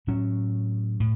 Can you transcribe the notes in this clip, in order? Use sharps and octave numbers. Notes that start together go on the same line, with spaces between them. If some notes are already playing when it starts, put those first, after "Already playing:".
A2 F#3 C#4
A2